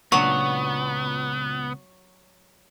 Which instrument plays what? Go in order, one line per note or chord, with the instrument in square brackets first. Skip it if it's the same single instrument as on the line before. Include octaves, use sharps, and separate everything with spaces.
[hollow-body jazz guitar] C#2 A#2 D4 [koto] F#3 [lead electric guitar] B3 [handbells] C#6